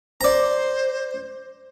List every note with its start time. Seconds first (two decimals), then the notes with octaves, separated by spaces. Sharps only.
0.21 C5 D5 A#5